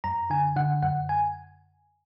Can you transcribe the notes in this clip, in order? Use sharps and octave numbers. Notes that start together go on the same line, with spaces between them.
F#2 A#5
D3 G#5
D3 F#5
F#2 F#5
G#5